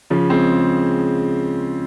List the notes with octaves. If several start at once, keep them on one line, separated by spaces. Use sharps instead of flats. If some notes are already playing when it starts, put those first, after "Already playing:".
C#3 F3
G#3 C4